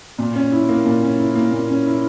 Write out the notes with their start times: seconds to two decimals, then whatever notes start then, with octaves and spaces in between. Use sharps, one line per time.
0.18 A#2
0.35 C#4
0.52 E4
0.69 A#3
0.85 A#2
1.02 C#4
1.19 E4
1.36 A#3
1.53 A#2
1.69 C#4
1.86 E4